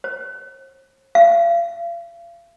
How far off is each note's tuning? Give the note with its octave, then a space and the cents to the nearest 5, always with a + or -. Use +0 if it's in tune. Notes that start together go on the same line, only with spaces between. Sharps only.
C5 +45
F5 -40